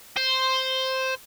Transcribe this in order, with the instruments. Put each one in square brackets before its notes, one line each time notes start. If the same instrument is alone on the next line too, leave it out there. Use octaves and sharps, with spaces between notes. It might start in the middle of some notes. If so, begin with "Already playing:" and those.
[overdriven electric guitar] C5